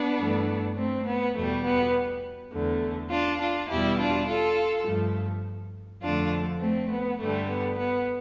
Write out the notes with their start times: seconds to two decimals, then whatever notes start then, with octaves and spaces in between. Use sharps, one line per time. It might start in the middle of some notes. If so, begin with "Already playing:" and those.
Already playing: B3 D4
0.19 G2 E3 A3
0.77 A3 C4
1.06 B3
1.36 E2 B2 G3 A3
1.65 B3
2.53 E2 D3 A3
3.11 D4 F4
3.40 D4 F4
3.69 E2 B2 G3 E4 G4
3.99 D4 F4
4.28 F4 A4
4.86 G2 F3 A3
6.03 F2 D3 A3 D4 F4
6.61 A3 C4
6.91 B3
7.19 G2 D3 G3 A3
7.49 B3
7.78 B3